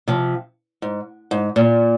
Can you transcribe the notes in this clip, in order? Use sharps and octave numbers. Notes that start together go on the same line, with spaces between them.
C3 F3
G#2
G#2
A#2